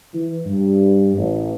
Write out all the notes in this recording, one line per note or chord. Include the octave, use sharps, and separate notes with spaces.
E3
G2
A1